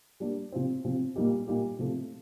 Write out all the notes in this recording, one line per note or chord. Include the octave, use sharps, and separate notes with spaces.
G3 A#3 D4
C3 F3 C4
C3 F3 C4
A#2 G3 A#3 D#4 G4
A#2 G3 A#3 D#4 G4
C3 F3 A3